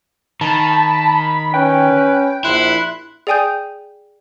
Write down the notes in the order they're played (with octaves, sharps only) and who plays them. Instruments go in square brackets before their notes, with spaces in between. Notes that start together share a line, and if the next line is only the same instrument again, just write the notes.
[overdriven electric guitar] D#3 [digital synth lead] A5 [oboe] B5
[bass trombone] C#4 [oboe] B4 [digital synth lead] G5
[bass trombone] A#1 [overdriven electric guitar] E4 [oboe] C6 [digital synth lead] F#6
[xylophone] G#4 D5 G5 G#5 D#6 G6